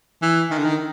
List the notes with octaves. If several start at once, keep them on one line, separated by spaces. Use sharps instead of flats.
E3
D#3
D3
D#3